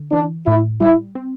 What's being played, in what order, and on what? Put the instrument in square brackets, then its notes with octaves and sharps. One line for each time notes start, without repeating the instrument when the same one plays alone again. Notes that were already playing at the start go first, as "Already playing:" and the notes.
Already playing: [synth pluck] D3
[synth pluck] E3 [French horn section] D4
[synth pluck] A2 [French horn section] E4
[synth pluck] G3 [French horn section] E4
[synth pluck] C4